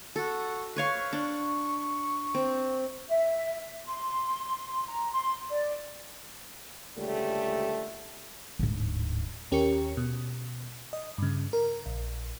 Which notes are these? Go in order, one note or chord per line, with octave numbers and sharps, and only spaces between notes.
F#4 A4
B4 C#5 F5 C#6
D4
C4
E5
C6
A#5
C6
D5
C#2 A#2 D3 G3 A3
D1 G#2
D#2 C#4 G4 A#4 C#5 C#7
B2
D#5
G2 C#3
A#4
A#1